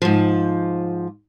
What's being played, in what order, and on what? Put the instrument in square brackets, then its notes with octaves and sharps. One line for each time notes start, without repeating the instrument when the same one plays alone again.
[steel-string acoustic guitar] G#2 F3